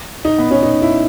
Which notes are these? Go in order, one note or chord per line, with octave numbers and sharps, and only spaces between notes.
D#4
B3
C#4
D#4
E4